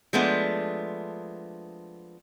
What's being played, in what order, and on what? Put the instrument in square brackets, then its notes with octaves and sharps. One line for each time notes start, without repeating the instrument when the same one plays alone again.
[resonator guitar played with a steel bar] F3 G#3 A3 B3 D4